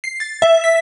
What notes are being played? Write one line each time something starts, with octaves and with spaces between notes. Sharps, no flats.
C7
A6
E5
B6